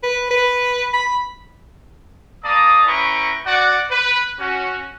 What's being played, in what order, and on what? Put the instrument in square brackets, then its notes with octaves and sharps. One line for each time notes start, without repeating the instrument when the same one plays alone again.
[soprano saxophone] B4
B4
B5
[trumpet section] A#3 D5 A5 A#5 D#6
C#4 E4 B4 G5 A#5 C#6
F#4 D5 F#5
B4
C#4 F#4